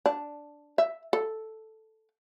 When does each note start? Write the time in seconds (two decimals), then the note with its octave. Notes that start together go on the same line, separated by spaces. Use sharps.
0.06 D4
0.78 E5
1.13 A4